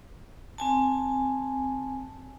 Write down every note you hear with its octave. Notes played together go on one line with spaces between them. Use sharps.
C4 G#5 A5